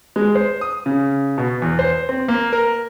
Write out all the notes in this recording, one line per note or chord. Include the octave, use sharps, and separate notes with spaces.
G#3
C5
D#6
C#3
B2
E2
C5
C4
A#3
A#4